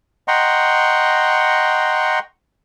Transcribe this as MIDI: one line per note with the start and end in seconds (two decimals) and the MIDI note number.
0.28 2.19 75
0.28 2.19 78
0.28 2.19 79
0.28 2.19 82
0.28 2.19 84
0.28 2.19 85